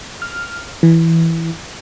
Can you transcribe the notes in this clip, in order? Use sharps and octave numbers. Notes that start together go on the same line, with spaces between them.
F6
E3